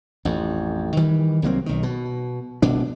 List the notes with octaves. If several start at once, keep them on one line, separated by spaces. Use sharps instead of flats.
A1 F2
D#3 E3 G3
C2 F#3 A#3 C4
B1 D#3
B2
F1 C2 B2 D4